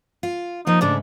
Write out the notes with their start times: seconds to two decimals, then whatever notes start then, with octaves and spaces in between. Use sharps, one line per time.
0.23 F4
0.67 F3 A#3 D#4
0.81 G#2 C#3 A3 D4